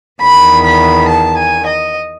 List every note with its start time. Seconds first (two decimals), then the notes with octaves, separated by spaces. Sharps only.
0.22 E2 D#3 B5
0.65 B5
1.09 A5
1.37 G#5
1.66 D#5